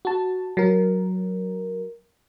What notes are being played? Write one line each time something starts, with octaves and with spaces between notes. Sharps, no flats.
F#4 A5
F#3 A#4